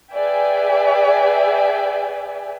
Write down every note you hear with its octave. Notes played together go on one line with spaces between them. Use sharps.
G#4 B4 D5 E5 G5 G#5